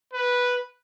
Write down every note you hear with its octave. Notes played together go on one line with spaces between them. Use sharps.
B4